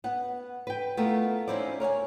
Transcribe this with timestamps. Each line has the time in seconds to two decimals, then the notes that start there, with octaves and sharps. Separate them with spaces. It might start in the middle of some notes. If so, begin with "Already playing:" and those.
0.04 B3 F#5
0.67 B4 G5
0.97 A3 B3 E4 F4 A#4
1.48 C4 C#4 D#4 E4 C5 D5
1.80 A#4 C#5 F#5 G#5